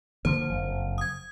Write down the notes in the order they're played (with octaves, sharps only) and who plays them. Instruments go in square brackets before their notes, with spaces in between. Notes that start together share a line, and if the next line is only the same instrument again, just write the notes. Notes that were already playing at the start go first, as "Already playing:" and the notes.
[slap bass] D3 F3 A#3 [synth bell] C5
[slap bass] F#1 F2
[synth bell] D#6 G#6